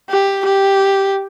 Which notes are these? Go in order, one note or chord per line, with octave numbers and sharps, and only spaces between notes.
G4
G4